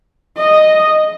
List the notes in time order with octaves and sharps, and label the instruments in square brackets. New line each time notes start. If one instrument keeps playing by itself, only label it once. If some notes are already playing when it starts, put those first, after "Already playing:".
[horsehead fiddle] D#5